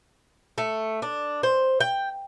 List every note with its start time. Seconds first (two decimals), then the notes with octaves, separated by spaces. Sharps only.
0.58 A3
1.02 D4
1.43 C5
1.80 G5